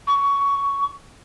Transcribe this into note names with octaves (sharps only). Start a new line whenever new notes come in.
C#6